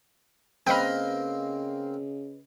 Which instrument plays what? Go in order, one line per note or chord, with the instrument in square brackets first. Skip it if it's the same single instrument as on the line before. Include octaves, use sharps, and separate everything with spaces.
[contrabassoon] C#3 [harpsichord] A#3 C4 [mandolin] B4 D#5 F6 [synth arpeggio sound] G5 B5